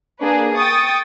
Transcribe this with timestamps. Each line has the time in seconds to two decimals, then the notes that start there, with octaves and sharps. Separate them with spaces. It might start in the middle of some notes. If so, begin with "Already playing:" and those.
0.22 A#3 D4 G#4 B4
0.57 G5 C#6 D#6 A6